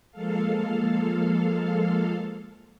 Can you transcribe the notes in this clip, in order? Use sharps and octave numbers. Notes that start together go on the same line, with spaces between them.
F3 G#3 A#3 A4 F5